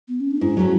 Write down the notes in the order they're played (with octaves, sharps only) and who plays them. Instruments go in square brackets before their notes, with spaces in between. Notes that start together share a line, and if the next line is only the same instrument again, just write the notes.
[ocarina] B3
C#4
D4
[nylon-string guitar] G#2 [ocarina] E4
[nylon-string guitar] F#3 A3 C#4